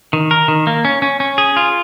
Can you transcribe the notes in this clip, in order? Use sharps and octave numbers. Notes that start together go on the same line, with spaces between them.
D#3
A#4
D#3
A#3
C#4
C#4
C#4
G#4
F4